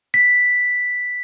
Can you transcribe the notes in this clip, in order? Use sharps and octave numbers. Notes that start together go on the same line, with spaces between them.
B6